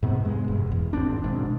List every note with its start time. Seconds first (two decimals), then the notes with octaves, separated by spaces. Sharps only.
0.03 G#2 C3 B3
0.25 G2 G#3
0.48 E1
0.72 E2
0.93 G#1 C4 D4
1.24 G#1 G#2 B2 D4